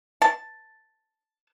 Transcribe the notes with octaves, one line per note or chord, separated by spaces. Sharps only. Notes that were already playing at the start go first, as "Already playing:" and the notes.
A5